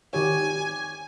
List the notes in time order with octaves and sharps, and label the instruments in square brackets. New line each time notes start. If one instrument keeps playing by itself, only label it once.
[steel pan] D#3 G4 C#5 [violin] G#5